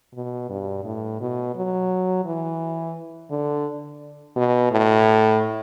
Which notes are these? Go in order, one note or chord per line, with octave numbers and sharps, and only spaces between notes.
B2
G2
A2
B2
F#3
E3
D3
B2
A2